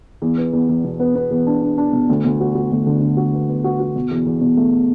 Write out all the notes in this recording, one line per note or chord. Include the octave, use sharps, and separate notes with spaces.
E2
B3
E2
E2
B2
B3
B3
E2
D4
D4
D4
B2
D2
D2
F#4
F#4
D2
D3
D3
F#4
B3
B3
F#4
F#4
B2
E2
E2
B2
A3